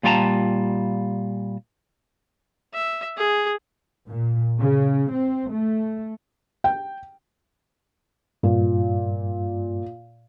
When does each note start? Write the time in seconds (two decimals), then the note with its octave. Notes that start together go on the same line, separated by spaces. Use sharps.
0.03 A#2 G3 F4 C#5 A5 A#5
2.74 E5
3.17 G#4
4.09 A#2
4.60 C#3
5.12 C4
5.52 A3
6.64 G5
8.43 G2 A#2